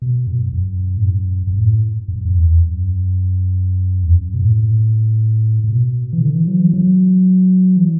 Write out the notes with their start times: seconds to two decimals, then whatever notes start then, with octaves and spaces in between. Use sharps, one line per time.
0.02 B2
0.27 F#2
0.53 F#2
0.97 A2
1.05 F#2
1.47 F#2
1.57 A2
2.08 F#2
2.25 F#2
2.34 E2
2.60 F#2
4.03 E2
4.14 F#2
4.34 B2
4.40 A2
5.64 A2
5.70 B2
6.13 E3
6.21 D3
6.34 E3
6.47 F#3
6.60 E3
6.73 F#3
7.77 E3